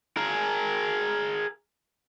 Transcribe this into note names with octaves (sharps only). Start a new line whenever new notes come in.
G#4 A#4